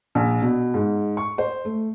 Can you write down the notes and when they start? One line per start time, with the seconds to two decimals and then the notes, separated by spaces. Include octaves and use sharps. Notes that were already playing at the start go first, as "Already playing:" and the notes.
0.15 A#1
0.42 B2
0.74 G#2
1.17 C#6
1.38 C5
1.65 A3